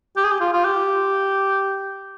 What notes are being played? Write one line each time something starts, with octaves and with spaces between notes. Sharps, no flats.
G4
G#4
G4
F4
F4
G4